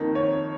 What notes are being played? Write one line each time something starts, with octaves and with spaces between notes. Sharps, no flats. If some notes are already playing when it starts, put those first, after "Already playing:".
Already playing: F2 D#3 A#3 D#4
C#5